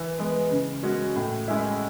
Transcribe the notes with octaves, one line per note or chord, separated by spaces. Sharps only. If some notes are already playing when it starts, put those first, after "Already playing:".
Already playing: E3
G#3 B3
C#3
G#3 C#4 F#4
A2
G#3 C#4 E4